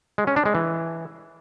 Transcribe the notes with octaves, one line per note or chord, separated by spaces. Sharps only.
G#3
C#4
D4
G#3
E3